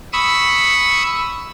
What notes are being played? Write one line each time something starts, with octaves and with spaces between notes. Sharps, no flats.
B5 C#6 D#6 E6